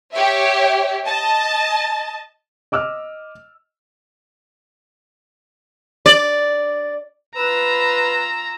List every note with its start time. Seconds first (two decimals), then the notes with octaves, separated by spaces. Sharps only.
0.13 G4 C#5 E5
1.07 D#5 A5
2.72 D#5 D6 E6 F6
6.06 D5
7.37 F4 B4 A#5 E6